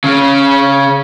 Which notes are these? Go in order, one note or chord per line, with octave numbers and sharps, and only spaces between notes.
C#3 C#4